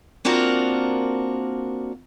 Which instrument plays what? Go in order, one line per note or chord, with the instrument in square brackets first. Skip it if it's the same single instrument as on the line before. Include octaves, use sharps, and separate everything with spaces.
[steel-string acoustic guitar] A#3 C4 D4 F4 F#4 A#4